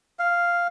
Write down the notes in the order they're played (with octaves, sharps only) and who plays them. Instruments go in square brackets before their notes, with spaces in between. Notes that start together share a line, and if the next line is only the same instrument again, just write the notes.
[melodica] F5